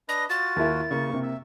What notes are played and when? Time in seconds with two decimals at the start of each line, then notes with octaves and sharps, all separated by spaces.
0.09 D4 B4 D#5 A#6
0.30 F4 F#4 A6
0.56 D#2 E4 A#4
0.91 C#3 A#3 C#6
1.10 C3 A#3
1.23 E5